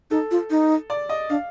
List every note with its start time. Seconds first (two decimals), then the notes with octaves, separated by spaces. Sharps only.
0.11 D#4 A4
0.31 F4
0.50 D#4
0.90 D5
1.09 D#5
1.30 D4 F5